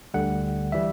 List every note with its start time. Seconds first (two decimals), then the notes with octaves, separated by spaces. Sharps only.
0.14 D2 D3 G3 F#5
0.72 E3 G3 E5